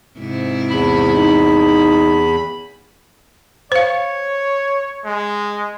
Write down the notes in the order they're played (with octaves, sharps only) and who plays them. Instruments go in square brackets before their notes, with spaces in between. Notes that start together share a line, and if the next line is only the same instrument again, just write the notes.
[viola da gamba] G#2 C3 E4
[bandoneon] E2 B5
[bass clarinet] D#4
[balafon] C5 F5 [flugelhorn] C#5
[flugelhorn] G#3